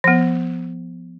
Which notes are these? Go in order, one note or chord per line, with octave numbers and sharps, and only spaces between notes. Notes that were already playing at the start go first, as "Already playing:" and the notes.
F3 B3